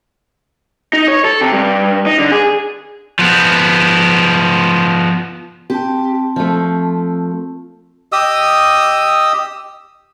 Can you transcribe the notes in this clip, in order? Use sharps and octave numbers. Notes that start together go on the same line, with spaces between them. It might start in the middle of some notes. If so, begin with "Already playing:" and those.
D#4
C#5
A4
C3
G2
D#4
D3
G#4
F3 B3
C4 G4 A5
F3 A3
G4 D#5 D#6 E6